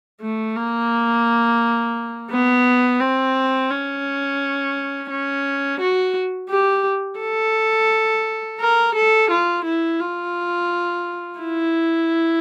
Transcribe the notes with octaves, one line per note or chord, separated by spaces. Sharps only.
A3
A#3
B3
C4
C#4
C#4
F#4
G4
A4
A#4
A4
F4
E4
F4
E4